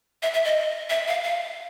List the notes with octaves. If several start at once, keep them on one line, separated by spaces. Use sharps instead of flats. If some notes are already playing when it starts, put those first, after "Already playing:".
E5
E5
D#5
E5
F5
F5